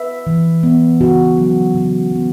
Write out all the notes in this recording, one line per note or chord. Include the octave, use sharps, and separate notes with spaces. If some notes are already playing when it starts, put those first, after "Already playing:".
Already playing: B4 E5
E3
B3
C#3 F#4
F#3 B3
C#3
F#3 B3